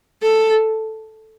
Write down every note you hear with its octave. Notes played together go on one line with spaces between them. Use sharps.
A4